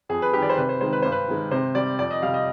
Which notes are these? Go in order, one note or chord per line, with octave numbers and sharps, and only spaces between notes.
F2 G#4
B4
D#3 G3 G4
D5
C5
C3 B4
C5
D#3 G#3 C5
B4
G2 C5
B4
D#3 G#3
C3 C5
G3 D5
F2 D5
D#5
C3 G3 F5
D#5